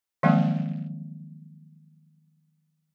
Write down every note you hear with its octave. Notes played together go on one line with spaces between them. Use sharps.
D#3 F3 F#3 G#3 A#3 C4